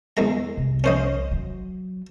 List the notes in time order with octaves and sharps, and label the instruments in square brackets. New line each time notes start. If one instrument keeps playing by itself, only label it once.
[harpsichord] E2 G#3 A#5
[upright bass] C2
[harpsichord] C#4 C5 D#5
[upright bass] F#3